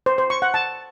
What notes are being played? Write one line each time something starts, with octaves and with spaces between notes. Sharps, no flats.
C5
C5
C#6
F#5
A5